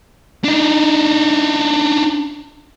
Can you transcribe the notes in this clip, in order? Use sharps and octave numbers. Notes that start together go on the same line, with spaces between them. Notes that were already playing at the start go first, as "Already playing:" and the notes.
D4 D#4